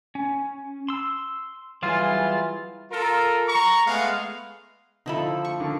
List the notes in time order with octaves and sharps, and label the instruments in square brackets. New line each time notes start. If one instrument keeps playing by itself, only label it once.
[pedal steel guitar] C#4
C6 E6
[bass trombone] E3 [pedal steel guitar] F#3 G3 G#4 [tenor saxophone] F4
[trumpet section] F4 A4 A#4
A#5 C#6
G#3 A3 B3 F5
[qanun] D3 F3 A4 [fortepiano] D#4 E4 B5
[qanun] C#6
[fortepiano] D3 D#3